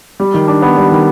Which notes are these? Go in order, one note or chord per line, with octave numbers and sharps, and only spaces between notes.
G3
D#3
D4
B3
G3
D#3